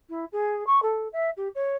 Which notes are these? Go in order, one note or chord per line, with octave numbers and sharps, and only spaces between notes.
E4
G#4
C#6
A4
E5
G4
C#5